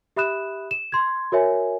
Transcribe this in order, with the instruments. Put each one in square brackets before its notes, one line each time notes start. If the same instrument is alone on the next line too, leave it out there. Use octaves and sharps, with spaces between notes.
[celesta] G4 E5 B5 D#6 F#6 E7
E7
C6 G#6
F#4 A#4 C#5 E5 G#5